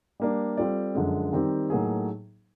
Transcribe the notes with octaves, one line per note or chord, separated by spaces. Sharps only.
G3 A#3 D4
G3 C4 F4 A4 D5
F#2 D3 F3 G#3
D#3 G3 C4 D#4 G4
A2 F#3 A#3 D#4 G#4